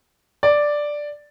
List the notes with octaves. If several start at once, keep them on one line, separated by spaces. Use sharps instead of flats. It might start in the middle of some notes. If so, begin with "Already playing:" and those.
D5